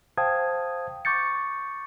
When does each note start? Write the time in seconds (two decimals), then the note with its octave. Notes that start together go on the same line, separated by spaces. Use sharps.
0.17 C5 F5 G5 A5 D#6 G#6
1.05 C#6 D6 G6 A6 C#7